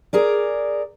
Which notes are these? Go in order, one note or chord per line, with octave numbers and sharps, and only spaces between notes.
G#4 A#4 D5